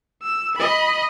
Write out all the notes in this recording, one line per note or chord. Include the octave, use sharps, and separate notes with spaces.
E6
D#5 B5